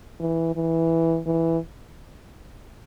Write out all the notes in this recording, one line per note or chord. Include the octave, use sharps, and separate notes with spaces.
E3
E3
E3